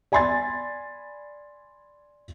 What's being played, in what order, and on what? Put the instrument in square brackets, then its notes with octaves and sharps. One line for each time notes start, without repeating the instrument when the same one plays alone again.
[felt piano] D5 G#5 B5 C6 G#6 A6